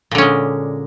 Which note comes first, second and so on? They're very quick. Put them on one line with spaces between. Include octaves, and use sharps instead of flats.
A#2 D3 C#4 G#3